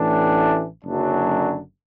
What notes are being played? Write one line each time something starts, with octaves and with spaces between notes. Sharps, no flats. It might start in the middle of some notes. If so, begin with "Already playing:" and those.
Already playing: A1 A2 E3 D4
F#1 F#2 D3 F#3 D4